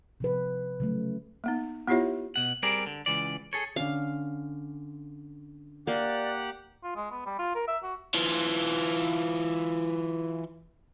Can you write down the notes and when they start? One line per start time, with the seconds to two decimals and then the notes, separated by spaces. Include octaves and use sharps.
0.20 C3 F3 B4
0.80 C#3 F#3 A3
1.44 A#3 B3 D#4
1.88 B3 E4 F4 G4 C#5 E5
2.36 B2 F#5
2.63 G3 C4 G#4 A#4 D5
2.87 D3
3.06 C#2 E3 D5
3.53 G#4 A4 C#5
3.76 D3 C#4 F5
5.87 A#3 G4 D5 F#5 F#6
6.83 F4
6.96 G#3
7.11 B3
7.26 G3
7.39 F4
7.55 A#4
7.68 E5
7.83 F#4
8.15 E3 F4